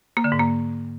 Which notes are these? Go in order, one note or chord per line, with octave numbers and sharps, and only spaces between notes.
A#3
D3
G#2
A#3